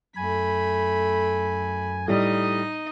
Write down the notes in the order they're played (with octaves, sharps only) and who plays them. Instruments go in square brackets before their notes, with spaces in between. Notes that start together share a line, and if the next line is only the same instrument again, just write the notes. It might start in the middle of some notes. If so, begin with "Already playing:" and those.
[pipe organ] F#2 G#5 [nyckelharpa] A3 B5
[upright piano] A2 G3 [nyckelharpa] D#4 D#5